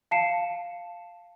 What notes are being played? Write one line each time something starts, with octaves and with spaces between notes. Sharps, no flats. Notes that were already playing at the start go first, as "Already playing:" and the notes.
F5 A5 C7 C#7 E7